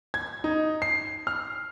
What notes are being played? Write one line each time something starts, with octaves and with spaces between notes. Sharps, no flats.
G#6
D#4
C7
F6